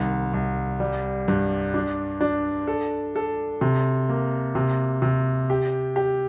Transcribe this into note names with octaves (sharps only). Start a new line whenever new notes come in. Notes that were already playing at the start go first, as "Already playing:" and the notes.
Already playing: C2 D#3
C2
G3
G2
D4
D4
A4
A4
C3
A#3
C3
C3
G4
G4